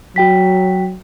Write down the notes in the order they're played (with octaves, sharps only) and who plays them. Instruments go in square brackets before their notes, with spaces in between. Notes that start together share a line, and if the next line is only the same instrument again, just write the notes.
[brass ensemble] F#3 [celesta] F#4 G5 B6